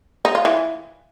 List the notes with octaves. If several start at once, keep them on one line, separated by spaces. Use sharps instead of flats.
D#4
F4
E3